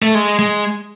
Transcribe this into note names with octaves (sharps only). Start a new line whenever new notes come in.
A3
G#3
G#3